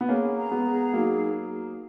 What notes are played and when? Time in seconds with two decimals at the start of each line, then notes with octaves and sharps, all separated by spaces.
0.01 B3
0.09 A#3 C#4 G#4
0.37 A#5
0.51 G#3 B3
0.65 G#4
0.93 F#3 A#3 D#4